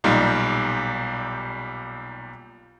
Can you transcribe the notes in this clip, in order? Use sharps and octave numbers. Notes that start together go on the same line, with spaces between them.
B1 A#2 G3 D#4 G4